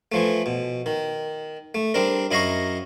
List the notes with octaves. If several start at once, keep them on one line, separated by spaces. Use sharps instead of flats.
E3 F3 A3
B2
D#3
A3
G3 C4 D4 A#4
F#2 E4 D#5 F5 A#5 C#6